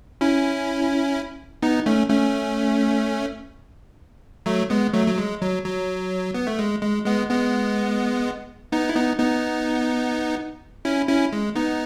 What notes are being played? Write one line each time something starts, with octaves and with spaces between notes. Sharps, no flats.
C#4 E4
B3 D#4
A3 C#4
A3 C#4
F#3 A3
G#3 B3
F#3 A3
F#3
G#3
F#3
F#3
B3
A3
G#3
G#3
G#3 B3
G#3 B3
B3 D#4
E4
B3 D#4
B3 D#4
C#4 E4
C#4 E4
G#3
B3 D#4